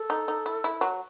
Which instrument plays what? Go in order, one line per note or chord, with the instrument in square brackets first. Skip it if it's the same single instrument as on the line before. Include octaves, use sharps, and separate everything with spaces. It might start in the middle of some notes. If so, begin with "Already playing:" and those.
Already playing: [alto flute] A4
[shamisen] D#4
D#4
E4
E4
F#3